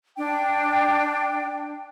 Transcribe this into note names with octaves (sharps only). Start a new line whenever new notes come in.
D4 G5